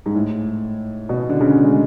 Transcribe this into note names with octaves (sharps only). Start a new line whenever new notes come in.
G#2
A2
B2
D3
C#3
G#3